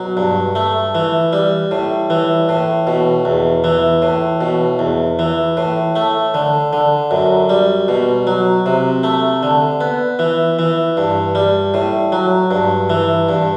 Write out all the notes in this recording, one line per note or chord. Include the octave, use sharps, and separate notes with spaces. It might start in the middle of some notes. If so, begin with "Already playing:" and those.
Already playing: B2 F#3
G2
A3
E3
G3
A2
E3
A2
B2
E2
E3
A2
B2
E2
E3
A2
A3
D3
D3
F#2
G3
B2
F#3
C3
A3
D3
B3
E3
E3
G2
G3
A2
F#3
G2
E3
G2